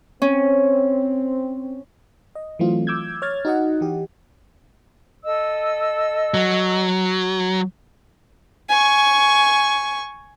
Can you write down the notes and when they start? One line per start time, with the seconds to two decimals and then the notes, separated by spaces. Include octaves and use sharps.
0.22 C4 C#4
2.35 D#5
2.59 E3 F#3 A3 C4 F4
2.87 D6 E6 G6 G#6
3.22 C#5 F6 G#6 A6
3.45 D#4 F#4 D#5 F#5
3.81 E3 G4
5.23 A4 D#5 E6
6.34 F#3
8.69 G#5 C#6